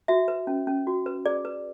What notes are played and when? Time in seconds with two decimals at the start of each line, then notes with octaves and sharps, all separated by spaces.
0.08 F#4 E5
0.28 B4
0.47 C#4
0.67 C#4
0.87 F#4
1.06 B4
1.25 G#4 D5
1.45 B4